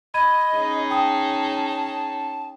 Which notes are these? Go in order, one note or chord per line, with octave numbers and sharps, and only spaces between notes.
D#5 B5 G#6 D#7
C#4 D#4 G#4
G5 A5 D#6